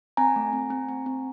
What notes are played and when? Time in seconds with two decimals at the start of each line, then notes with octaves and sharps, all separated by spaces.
0.17 C4 G#5 A#5
0.36 A3
0.53 C4
0.70 C4
0.88 C4
1.06 C4